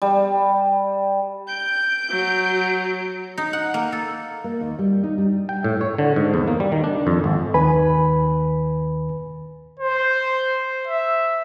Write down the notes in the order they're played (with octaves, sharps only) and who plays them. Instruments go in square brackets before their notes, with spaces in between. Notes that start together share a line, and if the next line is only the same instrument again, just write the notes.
[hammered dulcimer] G3
[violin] G6 D7
[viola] F#3
[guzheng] D#4
F#5
A#3
A4
[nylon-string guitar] A#3
D#2
G3
D#4
G3
[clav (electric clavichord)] G5
A2
C#5
D3
G#2
E2
A#3
G3
D#3
D4
F2
G#1
[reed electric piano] D#2 D#3 B4 G#5 B5
[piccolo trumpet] C5
E5